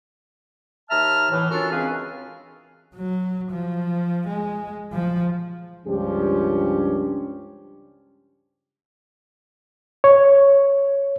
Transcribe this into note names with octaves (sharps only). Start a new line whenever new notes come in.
D#2 E5 A5 A#5 F6
A2 E3
C#4 D4 F4 F#4 A4 A#4
C#2 C4 G#4 B4 F5 G#5
F#3
F3
G#3
F3
C#2 G2 F3 C#4 D4 G4
C#5